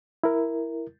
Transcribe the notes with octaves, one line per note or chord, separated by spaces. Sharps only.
E4 A#4